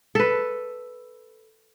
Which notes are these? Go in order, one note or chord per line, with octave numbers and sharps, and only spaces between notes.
A4 B4